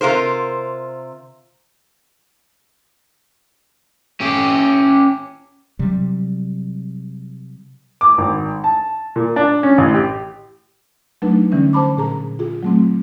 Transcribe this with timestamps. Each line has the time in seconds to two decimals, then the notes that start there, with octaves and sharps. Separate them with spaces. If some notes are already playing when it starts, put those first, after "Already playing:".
0.01 C3 F4 A#4 C5
4.21 C#4 G4
5.79 C3 F#3 G3
8.01 D6
8.18 G#1
8.64 A5
9.16 A#2
9.36 D4
9.63 C#4
9.78 A1
9.94 G4
11.22 F#3 A3 D4 D#4 B4
11.52 D3 E3 G3 C#4
11.73 C5 A5 B5 D6
11.97 A#2 G#4 A#5
12.39 F4 G#4
12.63 F#3 A3 C4